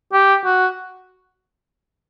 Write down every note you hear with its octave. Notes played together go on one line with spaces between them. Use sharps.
G4
F#4